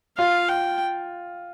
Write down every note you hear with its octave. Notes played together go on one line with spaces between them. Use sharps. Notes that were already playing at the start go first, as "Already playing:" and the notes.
F4 F5
G5